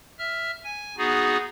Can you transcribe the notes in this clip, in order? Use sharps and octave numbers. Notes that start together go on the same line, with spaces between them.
E5 F6
G#5
B3 D#4 F#4 G#4